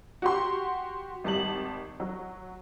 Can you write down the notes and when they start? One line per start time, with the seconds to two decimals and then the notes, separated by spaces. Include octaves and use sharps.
0.22 F#4 G4 C6
1.24 G#1 G3 A5 F#7
2.00 F#3